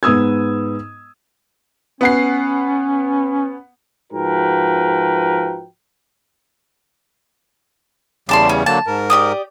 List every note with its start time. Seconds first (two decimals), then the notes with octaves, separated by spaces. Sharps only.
0.03 G#2 B3 D#6 E6 G#6
2.01 B3 C#4 F#5 C7
4.13 G#2 F3 F#4 A#4 B4 G5
8.29 E2 C#3 G3 D5 A5 C6
8.49 C#4
8.66 D3 F#3 A#3 A5
8.87 G#2 A#4
9.10 G4 D5 D#6